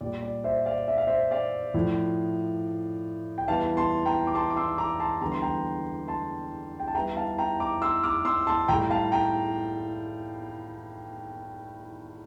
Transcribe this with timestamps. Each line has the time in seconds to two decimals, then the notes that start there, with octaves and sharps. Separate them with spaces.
0.01 A#2 G3 D5
0.22 D5
0.44 C5 E5
0.66 D5 F5
0.88 E5
0.97 F5
1.07 C5 E5
1.31 D5 F5
1.74 A2 F3
3.38 G5
3.48 E2 E3 G3 F5 A5
3.77 A5 C6
4.06 G5 A#5
4.27 D6
4.35 A5 C6
4.50 D6
4.56 C6 E6
4.78 A#5 D6
5.00 A5 C6
5.21 E2 D3 G3 A#5
5.32 C6
5.42 G5 A#5
6.08 A5 C6
6.80 G5
6.88 A5
6.95 E2 E3 G3 G5 A#5
7.16 F5 A5
7.38 G5 A#5
7.60 A#5 D6
7.82 C6 E6
8.03 D6 F6
8.25 C6 E6
8.47 A5 C6
8.68 A2 G3 G5 A#5
8.90 F5 A5
9.12 G5 A#5